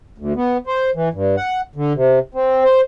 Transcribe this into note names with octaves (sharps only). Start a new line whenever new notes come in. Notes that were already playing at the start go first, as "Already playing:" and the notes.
D2
B3
C5
E3
G2
F#5
D3
C3
C4
C5